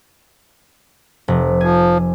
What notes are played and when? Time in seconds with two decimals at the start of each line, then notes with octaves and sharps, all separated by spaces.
1.28 F1
1.61 F3 G#5